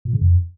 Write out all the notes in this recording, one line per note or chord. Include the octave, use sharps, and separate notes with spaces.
A#2
C#3
F2